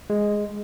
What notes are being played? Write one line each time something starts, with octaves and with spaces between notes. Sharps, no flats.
G#3